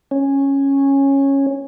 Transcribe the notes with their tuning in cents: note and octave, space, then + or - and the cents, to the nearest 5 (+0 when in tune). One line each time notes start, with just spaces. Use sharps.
C#4 -10